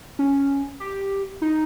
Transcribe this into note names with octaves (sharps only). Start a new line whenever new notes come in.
C#4
G4
D#4